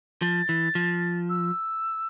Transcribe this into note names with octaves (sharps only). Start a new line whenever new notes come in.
F3 A6
E3
F3
E6